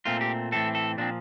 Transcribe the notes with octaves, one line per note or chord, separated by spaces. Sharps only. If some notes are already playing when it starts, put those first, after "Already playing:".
A#2 A3 C4 F4
G4
A2 E3 A3 C4 A4
A4
A#2 F3 C4 D4